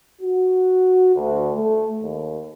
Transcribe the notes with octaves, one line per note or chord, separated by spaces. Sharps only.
F#4
D2
A3
D#2